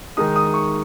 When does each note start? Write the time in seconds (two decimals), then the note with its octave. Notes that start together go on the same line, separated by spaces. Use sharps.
0.17 D#3 G#3 D#4 D#6
0.36 D#6
0.54 C#6